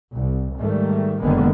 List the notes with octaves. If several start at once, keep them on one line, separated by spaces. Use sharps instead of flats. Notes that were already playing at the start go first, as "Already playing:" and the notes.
C2
G#2 D#3 G3 A3
F#1 D3 D#3 G#3 A#3 B3